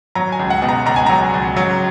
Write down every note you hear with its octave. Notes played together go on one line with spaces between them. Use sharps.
F#3 A#5
G#5
C#2
F#5
B2
A#5
C#2 A#5
G#5
F#3 A#5
C#2
F#3